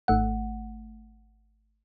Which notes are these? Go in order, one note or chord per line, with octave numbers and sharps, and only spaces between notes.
G#1 A3 F#5